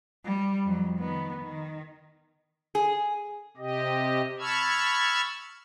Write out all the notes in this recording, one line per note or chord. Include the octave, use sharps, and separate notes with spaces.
G3
F2 F#3
D#3 B3
D#3
G#4
C3 G4 D#5
A5 B5 C#6 E6 F6 G#6